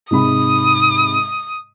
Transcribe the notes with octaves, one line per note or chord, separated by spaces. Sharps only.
G#2 C3 B5 D#6